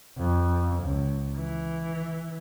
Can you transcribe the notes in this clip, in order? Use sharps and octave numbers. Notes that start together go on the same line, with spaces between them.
F2
C#2
E3